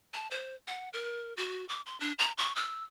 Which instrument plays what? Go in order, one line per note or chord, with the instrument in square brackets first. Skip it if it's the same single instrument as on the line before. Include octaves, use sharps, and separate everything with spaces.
[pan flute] A5
C5
F#5
A#4
F#4
D6
C6
D4
A#5
C#6
E6